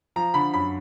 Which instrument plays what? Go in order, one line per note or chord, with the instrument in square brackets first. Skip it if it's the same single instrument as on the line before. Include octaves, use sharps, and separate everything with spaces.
[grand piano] F3 A#5
D3 B5
F#2 B5